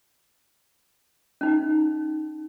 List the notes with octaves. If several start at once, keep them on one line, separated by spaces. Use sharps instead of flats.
C#4 D#4